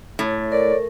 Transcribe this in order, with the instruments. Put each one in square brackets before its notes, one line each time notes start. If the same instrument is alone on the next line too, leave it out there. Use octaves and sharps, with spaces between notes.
[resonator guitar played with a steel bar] A2 [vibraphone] C#5
[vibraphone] A#4 [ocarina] C#5 [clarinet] D5